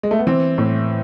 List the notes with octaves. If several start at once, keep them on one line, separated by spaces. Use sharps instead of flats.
G#3
A3
B3
E3 C4
A2